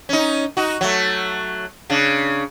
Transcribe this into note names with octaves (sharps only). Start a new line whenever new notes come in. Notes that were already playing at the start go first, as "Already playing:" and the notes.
C#4 D#4
D#4 F#4
F#3 A3
C#3 D4